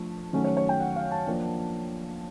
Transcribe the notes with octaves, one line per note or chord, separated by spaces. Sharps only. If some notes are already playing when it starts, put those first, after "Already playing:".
Already playing: F3 A3 D4
D#3 F#3 A3 C#4
C#5
C#5
G5
F#5
F5
A5
F3 A#3 D4